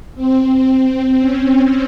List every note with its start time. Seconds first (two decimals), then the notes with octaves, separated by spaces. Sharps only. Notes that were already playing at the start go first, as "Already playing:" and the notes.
0.15 C4
1.19 C#4